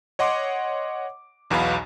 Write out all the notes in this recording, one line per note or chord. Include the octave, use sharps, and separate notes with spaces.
C#5 D#5 F#5 C6 D6
B1 E2 B2 B3 F5 B5